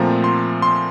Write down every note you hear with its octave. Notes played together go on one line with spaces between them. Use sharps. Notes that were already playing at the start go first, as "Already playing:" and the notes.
Already playing: A#2 F3 A3 C4 A#5
C6
C6